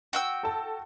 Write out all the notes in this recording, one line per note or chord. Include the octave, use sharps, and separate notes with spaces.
F#4 G5 E6
A4 A5